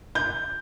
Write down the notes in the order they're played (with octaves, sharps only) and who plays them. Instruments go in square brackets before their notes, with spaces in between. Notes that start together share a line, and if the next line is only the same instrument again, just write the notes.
[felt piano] G6